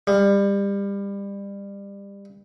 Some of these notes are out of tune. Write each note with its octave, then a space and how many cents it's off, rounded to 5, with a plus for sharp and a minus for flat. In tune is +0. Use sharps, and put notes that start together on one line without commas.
G3 +25